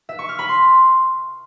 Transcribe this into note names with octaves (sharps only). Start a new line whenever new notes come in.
E5
C#6
F6
B5
C6